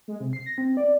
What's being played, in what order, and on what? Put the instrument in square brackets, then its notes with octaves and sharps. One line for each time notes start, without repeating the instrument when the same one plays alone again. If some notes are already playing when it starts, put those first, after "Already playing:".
[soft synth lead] G#3
C3
C7
A#6
C4
D5